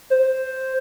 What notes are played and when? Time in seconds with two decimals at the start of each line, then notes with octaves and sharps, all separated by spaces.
0.10 C5